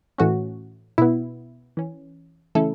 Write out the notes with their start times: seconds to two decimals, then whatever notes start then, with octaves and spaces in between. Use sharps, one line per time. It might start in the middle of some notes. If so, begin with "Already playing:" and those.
0.18 A2 E3 A3 C#4 F#4
0.98 B2 B3 E4
1.77 E3 C#4
2.55 C#3 E3 A3 C#4 E4 A4